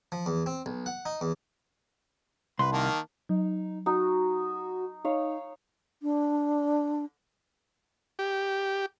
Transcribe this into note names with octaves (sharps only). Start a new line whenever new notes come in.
F3
E2
C4
B1
F#5
D#4
E2
C2 B4 C6
D#3 A#3 A5
F#3 D#4
D#4 F#4
D#4 C#5 F5
D4
G4